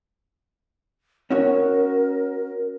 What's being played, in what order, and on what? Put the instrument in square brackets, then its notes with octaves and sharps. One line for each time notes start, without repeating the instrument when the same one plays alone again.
[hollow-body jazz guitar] C#4 F#4 C#5 [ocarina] A#4